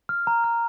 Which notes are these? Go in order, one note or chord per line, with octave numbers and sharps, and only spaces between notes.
F6
A#5
F6